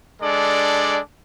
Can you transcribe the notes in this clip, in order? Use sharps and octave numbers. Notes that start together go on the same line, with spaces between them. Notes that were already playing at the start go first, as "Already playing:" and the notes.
G#3 D4 A4 D5